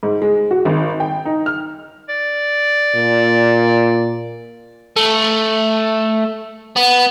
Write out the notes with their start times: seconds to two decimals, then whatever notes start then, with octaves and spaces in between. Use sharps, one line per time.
0.03 G#2
0.22 G#3
0.51 F#4
0.65 G#1
1.00 G5
1.25 D#4
1.46 F6
2.09 D5
2.95 A#2
4.96 A3
6.76 B3